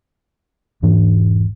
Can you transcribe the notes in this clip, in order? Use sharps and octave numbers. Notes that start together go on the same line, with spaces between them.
E1 G#2 E3 D4